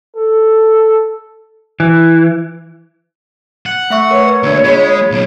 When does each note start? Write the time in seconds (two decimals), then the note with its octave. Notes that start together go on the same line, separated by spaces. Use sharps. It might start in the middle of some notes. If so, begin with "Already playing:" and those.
0.17 A4
1.80 E3
3.66 F#5
3.90 A3 E5 C#6
4.11 A#4 B4 C#5
4.43 D2 A#3 D4
4.64 G#3 F4 B5 B6
5.11 B1 C#3